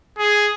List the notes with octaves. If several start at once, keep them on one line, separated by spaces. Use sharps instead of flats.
G#4